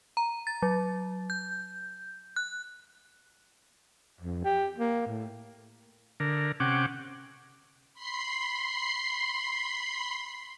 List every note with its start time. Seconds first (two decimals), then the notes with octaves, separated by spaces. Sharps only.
0.17 A#5
0.47 A6
0.62 F#3
1.30 G6
2.36 F#6
4.20 F2
4.44 G4
4.78 A#3
5.07 A2
6.20 D3 A#4
6.60 C3 C#4 F#5 G5 D6
7.93 B5 C6 C7